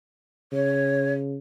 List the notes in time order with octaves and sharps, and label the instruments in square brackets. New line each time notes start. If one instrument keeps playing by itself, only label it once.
[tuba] C#3 [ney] C#5